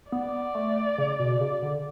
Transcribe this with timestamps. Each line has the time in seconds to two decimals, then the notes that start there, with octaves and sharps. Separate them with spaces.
0.12 B3 D5
0.55 A3
0.98 C#3
1.19 B2
1.41 C#3
1.62 D3